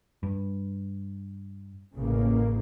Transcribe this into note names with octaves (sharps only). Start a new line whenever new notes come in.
G2
A1 C#3 A#3